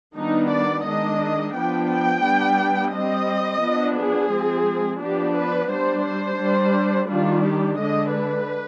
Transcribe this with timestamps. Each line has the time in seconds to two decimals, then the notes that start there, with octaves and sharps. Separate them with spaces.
0.16 D#3 G3 B3 D4 D#4
0.51 D5
0.86 D#3 G#3 D4 D#5
1.54 F3 B3 D4 G5
1.90 G5
2.24 G3 B3 D4
2.94 G3 C4 D#5
3.63 F3 B3 D4
3.98 G#4
4.32 F3 G#3 C4
5.01 F3 B3 D4 G4
5.36 B4
5.71 G3 D4 C5
6.06 C5
6.40 G3 D4
7.09 D#3 G3 D4 F4
7.44 G4
7.79 D3 G#3 D4 D#5
8.13 B4